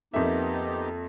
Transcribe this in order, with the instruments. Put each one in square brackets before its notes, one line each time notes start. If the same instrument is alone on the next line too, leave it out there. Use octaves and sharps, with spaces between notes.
[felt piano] F2 A#3 E5 [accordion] B3 D#4 G4